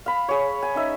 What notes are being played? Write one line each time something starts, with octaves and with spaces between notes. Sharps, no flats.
F5 B5
G#4 C#5
G#5
C#4 D#4 E5